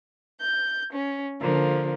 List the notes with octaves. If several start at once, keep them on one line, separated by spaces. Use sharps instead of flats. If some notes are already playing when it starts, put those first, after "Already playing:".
G6
C#4
D3 F3 A#3